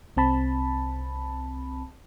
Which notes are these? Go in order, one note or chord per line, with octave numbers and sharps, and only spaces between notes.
C2 C4 A5 B5